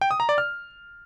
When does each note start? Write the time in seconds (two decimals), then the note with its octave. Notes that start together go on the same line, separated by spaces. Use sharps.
0.01 G5
0.11 D#6
0.20 A#5
0.29 D5
0.38 F6